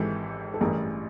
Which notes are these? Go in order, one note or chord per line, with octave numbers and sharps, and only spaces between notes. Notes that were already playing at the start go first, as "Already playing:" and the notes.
Already playing: G#1 G#2 E3 G4 A4
A4
A1 G2 E3 G#4 A#4